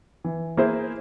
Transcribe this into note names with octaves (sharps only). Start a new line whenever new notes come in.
E3
A#3 E4 G#4 C5